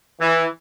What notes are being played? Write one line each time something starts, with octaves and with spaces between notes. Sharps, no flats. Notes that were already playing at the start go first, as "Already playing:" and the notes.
E3